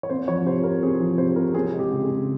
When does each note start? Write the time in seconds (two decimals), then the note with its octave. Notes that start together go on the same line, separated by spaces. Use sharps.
0.03 C#5
0.10 C4 C5
0.28 F3 C#5
0.45 C3 C5
0.64 C3 A#4
0.82 C4 G#4
1.00 F3 G#4
1.18 C3 C5
1.36 C3 A#4
1.54 C4 G#4
1.73 G#3
1.79 G4
1.90 C#3
2.04 G#4
2.09 C#3